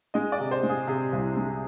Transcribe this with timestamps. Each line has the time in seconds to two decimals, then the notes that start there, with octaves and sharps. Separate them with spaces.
0.14 G#3 D#5
0.32 D5
0.39 C3
0.51 C5
0.63 G#3
0.69 G#4
0.87 C3 G#4
1.13 C2
1.37 G#3